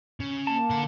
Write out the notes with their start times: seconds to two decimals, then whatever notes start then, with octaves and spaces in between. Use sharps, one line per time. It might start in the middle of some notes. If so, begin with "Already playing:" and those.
0.20 C#3
0.47 A#3 A5
0.70 D3 F#5